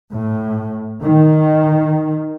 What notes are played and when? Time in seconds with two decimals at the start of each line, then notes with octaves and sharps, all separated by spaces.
0.13 A2
1.03 D#3